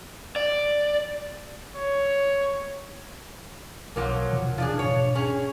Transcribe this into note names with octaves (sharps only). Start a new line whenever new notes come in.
D5
C#5
B1 F3 F#3 A#3
E1 C3 E3
F3 D4 G#4
G#2 B2 C#5
C#4 D4 G#4